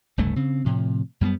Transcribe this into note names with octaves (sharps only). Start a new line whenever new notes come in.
F1 C#2 G2 A3
C#3 C4
A2 C3 F3
F#2 G3 G#3 B3